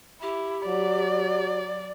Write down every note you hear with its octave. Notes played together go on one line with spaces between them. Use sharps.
E4 G4
F#3 D5